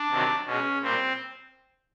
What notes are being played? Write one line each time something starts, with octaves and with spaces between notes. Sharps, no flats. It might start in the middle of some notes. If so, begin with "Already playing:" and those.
Already playing: D4
C3 D#3 F#3
B2 G#3 C#4
A#2 G3 C4